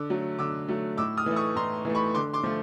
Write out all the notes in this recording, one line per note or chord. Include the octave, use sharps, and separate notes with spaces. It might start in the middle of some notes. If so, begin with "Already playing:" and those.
Already playing: D3 D6 E6
F#3 A3
D3 D6 E6
F#3 A3
A2 D6 E6
D#6 F6
E3 A3
C#6 D#6
A2 A#5 C6
E3 A3
B5 C#6
D3 C6 D6
C6 D6
F3 A3